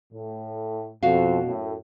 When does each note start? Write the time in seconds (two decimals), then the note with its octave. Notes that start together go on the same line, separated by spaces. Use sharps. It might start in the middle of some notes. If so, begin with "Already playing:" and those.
0.12 A2
1.03 F2 B2 F#4 F5
1.45 F#2 A2